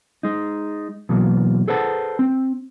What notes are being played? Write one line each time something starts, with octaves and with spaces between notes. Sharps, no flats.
G#3 D#4
B2 E3 F#3 A#3
G#4 A4 B4 C5 F#5 A5
C4